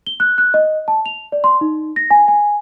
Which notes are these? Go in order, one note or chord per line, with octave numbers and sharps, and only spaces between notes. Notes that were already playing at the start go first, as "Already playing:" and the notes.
G7
F#6
F#6
D#5
A5
F7
D5
C6
D#4
A#6
G#5
G#5